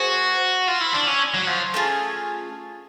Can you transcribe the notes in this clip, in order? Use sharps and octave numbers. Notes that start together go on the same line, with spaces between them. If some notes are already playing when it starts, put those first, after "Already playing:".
Already playing: A#3 F#4 G#4 C5
F4
E4
D4
C#4
F#3
F3
A3 C#4 F4 G#4